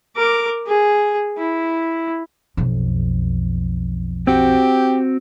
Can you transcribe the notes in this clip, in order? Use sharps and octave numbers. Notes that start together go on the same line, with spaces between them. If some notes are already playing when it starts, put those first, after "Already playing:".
A#4 D6
G#4
E4
B1 F2
C4 F#4 G4